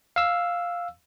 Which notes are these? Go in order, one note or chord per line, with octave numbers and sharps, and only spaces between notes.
F5 E6